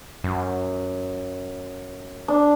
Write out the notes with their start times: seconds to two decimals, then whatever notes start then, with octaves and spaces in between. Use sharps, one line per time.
0.24 F#2
2.28 D4